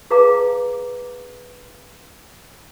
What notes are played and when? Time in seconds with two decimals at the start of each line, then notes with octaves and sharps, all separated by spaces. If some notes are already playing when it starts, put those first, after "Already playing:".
0.10 G#4 B4 F5 A#5 D6